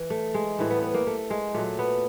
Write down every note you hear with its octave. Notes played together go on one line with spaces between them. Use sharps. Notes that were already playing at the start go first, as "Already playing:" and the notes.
Already playing: E3
A3
G#3
A2 E3 G3 A3
B3
B3
A#3
A3
G#3
A#2 F#3 A3
B3